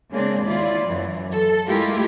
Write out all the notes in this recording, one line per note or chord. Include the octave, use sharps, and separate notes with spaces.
C#3 G#3 A#3 C4 D4
D#2 E4 F4 D5
F#2 E3
A4
G#3 A3 E4 F4 G4 A#4